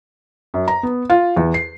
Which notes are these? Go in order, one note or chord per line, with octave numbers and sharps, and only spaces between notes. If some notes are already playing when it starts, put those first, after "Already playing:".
F#2
A#5
B3
F4
E2
C7